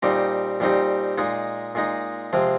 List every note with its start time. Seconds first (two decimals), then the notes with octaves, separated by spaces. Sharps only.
0.03 A#2 G3 C4 D#4 G4
0.60 A#2 G3 C4 D#4 G4
1.18 A#2 G#3 D#4
1.75 A#2 G#3 D#4
2.33 C3 F3 G#3 C4